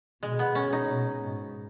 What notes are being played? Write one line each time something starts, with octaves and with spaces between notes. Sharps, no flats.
B2 G#3
B3
C#4
D#4
B2
G#2